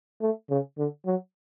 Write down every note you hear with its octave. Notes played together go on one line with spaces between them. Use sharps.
A3
C#3
D3
F#3